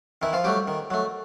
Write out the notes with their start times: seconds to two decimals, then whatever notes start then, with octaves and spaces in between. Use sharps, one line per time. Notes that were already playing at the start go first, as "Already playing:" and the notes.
0.22 D#3 E3 E4
0.33 F3 F4
0.44 F#3 G3 A3 G4
0.68 D#3
0.90 F#3 A3